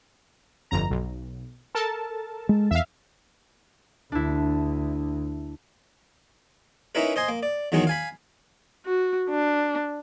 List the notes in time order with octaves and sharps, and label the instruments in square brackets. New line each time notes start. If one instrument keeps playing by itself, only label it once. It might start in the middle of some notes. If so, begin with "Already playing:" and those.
[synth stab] G1 F2 A#5
B1
A4 A#4 A5
[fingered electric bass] G#3
[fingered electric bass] E2 [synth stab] E5 F5
[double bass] D2 [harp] D4 E4
[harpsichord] C#4 D#4 E4 A#4 B4
C5 D#5 G#5 C6
A#3
D5
E2 D#3 F#3 G#3 D#4
F5 G#5 B5
[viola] F#4
D4